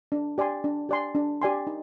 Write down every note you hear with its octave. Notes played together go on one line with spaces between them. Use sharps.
D4
G4 D5 G#5 C6
D4
G4 D5 G#5 C6
D4
G4 D5 G#5 C6
D#4